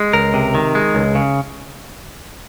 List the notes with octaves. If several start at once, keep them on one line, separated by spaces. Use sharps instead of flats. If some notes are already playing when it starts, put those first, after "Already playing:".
Already playing: G#3
C#2 A#4
C3
D#3
G#3
C#2
C#3